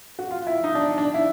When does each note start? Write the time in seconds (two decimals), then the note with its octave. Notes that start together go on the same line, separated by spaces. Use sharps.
0.19 F#4
0.31 F4
0.47 E4
0.64 D#4
0.75 D4
0.98 D4
1.14 E4